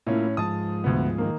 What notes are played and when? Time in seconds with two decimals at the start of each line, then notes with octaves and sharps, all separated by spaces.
0.07 A2 A#3 C#4 E4 F4
0.37 G#2 F3 A5 D#6
0.84 D2 B3
1.18 D#3 A#3